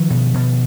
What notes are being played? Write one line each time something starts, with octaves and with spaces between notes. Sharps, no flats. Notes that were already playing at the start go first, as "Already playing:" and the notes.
Already playing: D#3 F3
B2
B2